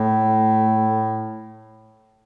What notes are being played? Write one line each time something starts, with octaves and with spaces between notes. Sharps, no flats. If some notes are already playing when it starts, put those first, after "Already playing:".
Already playing: A2 A3